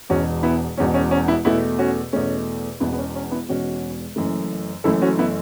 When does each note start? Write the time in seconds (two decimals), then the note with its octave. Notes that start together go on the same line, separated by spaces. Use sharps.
0.09 E1 E2 B2 C#4 F#4
0.43 B3 E4
0.77 E1 E2 B2 C#4
0.94 C#4
1.11 C#4
1.28 B3 E4
1.45 E2 B2 A3 B3 E4
1.79 C#4 F#4
2.13 E2 B2 A3 C#4
2.80 E1 E2 B2 B3 E4
2.93 B3
2.98 C#4
3.15 C#4
3.31 B3 E4
3.48 E1 E2 B2 C#4 F#4
4.16 F#1 F#2 E3 A3
4.84 F#1 F#2 E3 A3 E4 A4
5.02 C#4 F#4
5.19 B3 E4